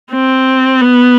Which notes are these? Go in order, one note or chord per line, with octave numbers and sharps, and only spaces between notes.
C4
B3